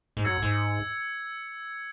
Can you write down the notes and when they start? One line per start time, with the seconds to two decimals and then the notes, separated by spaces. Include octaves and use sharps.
0.17 G#2
0.25 F#2 E6 G#6 C#7
0.42 G#2